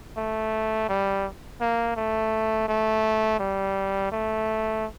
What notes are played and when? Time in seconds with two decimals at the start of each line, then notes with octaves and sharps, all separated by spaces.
0.17 A3
0.89 G3
1.61 A#3
1.96 A3
2.68 A3
3.39 G3
4.12 A3